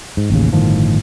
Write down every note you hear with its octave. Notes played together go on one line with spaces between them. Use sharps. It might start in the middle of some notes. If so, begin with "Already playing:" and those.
G#2
A1 D#2 C#3
G1 A2 D#3 F3